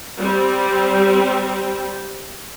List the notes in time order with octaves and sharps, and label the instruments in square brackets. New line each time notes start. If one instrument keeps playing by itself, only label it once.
[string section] G3 C4